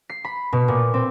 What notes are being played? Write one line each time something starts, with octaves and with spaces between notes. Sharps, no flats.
C7
B5
B2
A#2
C4